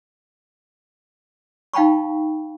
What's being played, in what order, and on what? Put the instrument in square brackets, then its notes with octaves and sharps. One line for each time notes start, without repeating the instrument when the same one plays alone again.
[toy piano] D#4 F5 G5 A5 B5 C#6